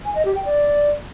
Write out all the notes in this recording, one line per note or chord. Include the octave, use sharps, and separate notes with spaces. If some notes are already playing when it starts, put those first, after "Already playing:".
G#5
D#5
G4
G5
D5